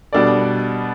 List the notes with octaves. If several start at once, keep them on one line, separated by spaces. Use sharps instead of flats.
B2 G3 D4 A4 D5